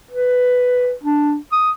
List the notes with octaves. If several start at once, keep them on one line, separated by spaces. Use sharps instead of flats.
B4
D4
D#6